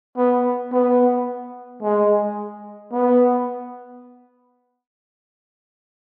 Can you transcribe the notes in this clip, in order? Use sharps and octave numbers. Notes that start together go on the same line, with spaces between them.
B3
B3
G#3
B3